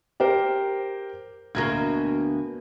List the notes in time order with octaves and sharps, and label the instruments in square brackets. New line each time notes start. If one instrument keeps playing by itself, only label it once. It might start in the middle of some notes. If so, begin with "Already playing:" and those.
[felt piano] G4 A#4 C5
[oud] D2 B2 A#3 [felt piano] G#6